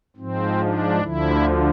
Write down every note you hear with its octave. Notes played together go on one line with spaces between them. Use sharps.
G#2 F3 C4
D4
D2 D3 F3 E4